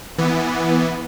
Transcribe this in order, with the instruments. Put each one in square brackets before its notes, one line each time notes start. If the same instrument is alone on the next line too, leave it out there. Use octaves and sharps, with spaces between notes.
[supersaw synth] E3 B3